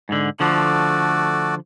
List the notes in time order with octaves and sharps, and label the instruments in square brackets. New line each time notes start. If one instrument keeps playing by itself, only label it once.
[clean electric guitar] G#2 D3
[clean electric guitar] D3 F3 [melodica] A3 F#4 D5